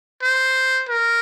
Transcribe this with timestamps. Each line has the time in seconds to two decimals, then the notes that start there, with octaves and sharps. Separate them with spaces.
0.23 C5
0.89 A#4